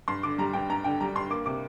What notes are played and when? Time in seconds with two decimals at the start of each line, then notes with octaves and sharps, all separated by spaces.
0.08 G2 C6
0.23 D3 D6
0.38 G3 A#5
0.53 G2 G5
0.69 G2 A#5
0.84 D3 G5
1.00 G3 A#5
1.16 G2 C6
1.30 A#3 D6
1.46 C3 D6